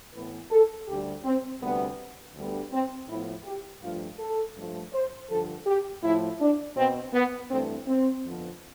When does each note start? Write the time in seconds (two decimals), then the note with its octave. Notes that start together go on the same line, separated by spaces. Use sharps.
0.14 A2 E3 B3 B4
0.51 A4
0.88 D2 D3 G3 G4
1.24 C4
1.62 D2 C3 G3 B3
2.35 D2 D3 G3 B3
2.72 C4
3.09 A2 F3 B3 E4
3.45 G4
3.82 G2 F3 A3 F4
4.19 A4
4.55 G2 F3 A3
4.93 C5
5.29 G2 D3 F3 A4
5.67 G4
6.03 A2 F3 A3 E4
6.40 D4
6.76 B2 B3 C4
7.13 B3
7.50 G2 E3 A3 C4
7.87 C4
8.23 F2 D3 F3 B3